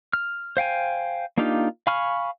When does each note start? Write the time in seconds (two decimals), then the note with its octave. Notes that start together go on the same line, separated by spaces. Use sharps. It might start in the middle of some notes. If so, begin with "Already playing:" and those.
0.13 F6
0.57 C5 F5 G5 G#5
1.38 A#3 D4 D#4 F4 G4
1.87 F5 G#5 B5 C#6 F6